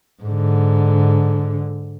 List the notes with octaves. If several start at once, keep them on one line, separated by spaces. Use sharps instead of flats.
G#2 D3